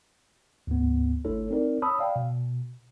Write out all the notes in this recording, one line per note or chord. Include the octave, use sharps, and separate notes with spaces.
D2 G#2 B3
G1 A3 D4 E4 A4 C#5
C4 D#4 A#4 D5
C#5 A5 B5 D#6 E6
D5 F5 G5
B2